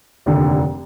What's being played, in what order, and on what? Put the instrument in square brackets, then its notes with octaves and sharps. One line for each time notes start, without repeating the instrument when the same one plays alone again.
[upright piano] F1 D#2 D3